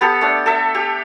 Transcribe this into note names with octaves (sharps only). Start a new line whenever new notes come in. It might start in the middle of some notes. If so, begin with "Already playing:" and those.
B3 G4 A4
A3 D4
A4 E5
G4